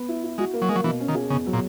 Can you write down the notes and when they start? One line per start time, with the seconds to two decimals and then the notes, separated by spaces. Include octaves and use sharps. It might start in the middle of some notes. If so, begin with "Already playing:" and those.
Already playing: B3
0.08 E4
0.23 E4
0.38 G#3 F#4
0.53 A#3
0.62 F#3
0.69 G#3 A#3
0.76 F#3
0.84 B2 E3
1.00 C#4
1.08 D#3
1.15 G#4
1.30 E2 C#3
1.46 F#3
1.53 A#2